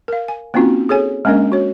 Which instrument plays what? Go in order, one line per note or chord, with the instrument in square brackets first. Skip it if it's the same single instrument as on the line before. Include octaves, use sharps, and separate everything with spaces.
[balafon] A#4 F5
G#5
A#3 C4 C#4 D#4 F4 F#4
G#4 A4 C#5 G#5
G#3 A#3 C#4 D4 A#4 D#5
F#4 C#5